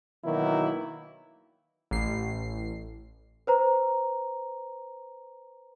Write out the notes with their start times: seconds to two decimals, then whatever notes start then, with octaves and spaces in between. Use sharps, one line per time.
0.25 B2 D#3 E3 F#3 A#3 E4
1.91 A1 C7
3.47 B4 C5 A#5